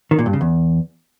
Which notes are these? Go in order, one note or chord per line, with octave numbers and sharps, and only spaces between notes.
D#3
A#2
G2
C#3
E2